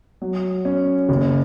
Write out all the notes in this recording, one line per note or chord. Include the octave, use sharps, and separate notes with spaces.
F#3
C#4
F#1